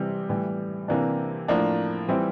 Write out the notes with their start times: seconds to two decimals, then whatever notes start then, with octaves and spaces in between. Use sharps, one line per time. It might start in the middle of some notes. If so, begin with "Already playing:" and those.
Already playing: C3 E3 G3
0.29 A2 E3 G3
0.88 C3 E3 A#3 D4
1.48 A2 F3 A#3 D4
2.08 E3 G3 C4 E4